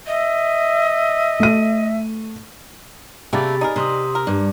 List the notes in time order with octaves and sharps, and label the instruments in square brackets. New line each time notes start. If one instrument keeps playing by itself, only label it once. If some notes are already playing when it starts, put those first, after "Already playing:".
[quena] D#5 [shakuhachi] E5
[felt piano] A3 D#7
[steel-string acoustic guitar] C3 [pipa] G3 A3 A#3 [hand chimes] G#4 B5 A6
[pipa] D#4 G#4 A#4 [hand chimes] D5
[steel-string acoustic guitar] C3 [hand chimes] A#5 C6 D#6
[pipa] A#4
[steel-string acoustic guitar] G2 [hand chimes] D5